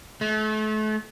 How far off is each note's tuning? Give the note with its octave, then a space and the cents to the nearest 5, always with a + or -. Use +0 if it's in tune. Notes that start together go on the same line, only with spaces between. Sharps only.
A3 -35